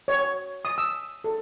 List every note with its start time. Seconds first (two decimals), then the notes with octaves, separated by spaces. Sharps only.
0.08 C#5
0.65 D#6
0.78 E6
1.24 A4